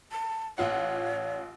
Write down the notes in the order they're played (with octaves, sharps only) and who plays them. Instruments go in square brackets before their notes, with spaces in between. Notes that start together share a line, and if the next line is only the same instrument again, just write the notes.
[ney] A5
[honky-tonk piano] A1 F4 F#5 [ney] C#5